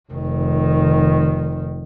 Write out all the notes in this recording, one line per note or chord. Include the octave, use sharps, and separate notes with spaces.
F1 D#3